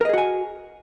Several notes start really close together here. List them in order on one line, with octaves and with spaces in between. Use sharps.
A#4 D#5 G#4 F#4 G#5